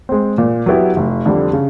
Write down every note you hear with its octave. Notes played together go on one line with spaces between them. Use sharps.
G#3 C4
A#2
F#3 B3 E4 G4
F1
F2 D3 G3
C#3